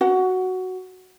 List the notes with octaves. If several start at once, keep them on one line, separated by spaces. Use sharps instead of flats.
F#4 F#5